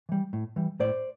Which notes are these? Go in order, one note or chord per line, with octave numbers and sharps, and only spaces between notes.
E3 G3
A2
E3 G3
A2 C5 D5